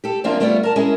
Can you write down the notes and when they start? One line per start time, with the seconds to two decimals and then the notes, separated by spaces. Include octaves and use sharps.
0.04 G4 A4
0.24 F#2 F3 A#3 C4 D4 F4
0.40 G3 A3 B3 F4 D5
0.63 A#4 A5
0.76 G#3 C#4 E4 G#4 A#4